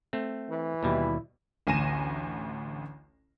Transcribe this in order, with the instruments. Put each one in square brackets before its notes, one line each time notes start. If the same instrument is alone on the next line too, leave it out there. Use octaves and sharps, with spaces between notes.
[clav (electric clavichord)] A3 C4
[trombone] E3
[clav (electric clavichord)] D#2 B2 G3 [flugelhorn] E4
[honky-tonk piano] A1 D2 G#5 A#6 D#7 E7